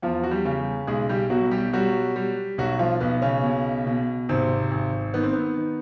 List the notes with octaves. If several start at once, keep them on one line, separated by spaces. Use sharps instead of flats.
E2 F3 F4
F#4
G3 G4
C#3
B1 G#3 G#4
G3 G4
B2 F#3 F#4
G3 G4
F#3 G3 F#4
G3
B1 F#3 F#4
F3 F4
B1 B3
C#3 C#4
B2
B2
G#1 C3 C4
G#1
D#3 B3
C4
B3
D#3